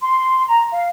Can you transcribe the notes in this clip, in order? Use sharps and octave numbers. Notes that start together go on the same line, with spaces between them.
C6
A#5
F5